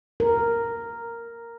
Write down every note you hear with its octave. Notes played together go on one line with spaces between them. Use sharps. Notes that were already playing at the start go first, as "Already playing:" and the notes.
A#4